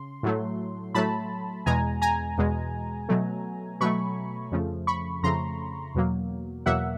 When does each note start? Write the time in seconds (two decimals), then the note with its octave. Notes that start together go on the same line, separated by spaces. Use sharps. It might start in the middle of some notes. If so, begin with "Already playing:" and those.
Already playing: C#3 C6
0.23 A2 F#3 A3
0.95 A2 F#3 A3 A5 B5
1.66 E2 B2 G#3 G#5 A#5
2.02 G#5 A#5
2.38 E2 B2 G#3
3.09 B2 F#3 A3
3.81 B2 F#3 A3 B5 C#6
4.52 F2 C#3 F3 A3
4.87 B5 C#6
5.23 F2 C#3 F3 A3 A#5 C6
5.95 E2 B2 F#3 A#3
6.66 E2 B2 F#3 A#3 E5 F#5